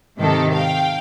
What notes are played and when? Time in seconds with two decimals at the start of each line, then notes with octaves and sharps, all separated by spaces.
0.17 G#2 C3 D#3 G4 A4
0.54 F5 G5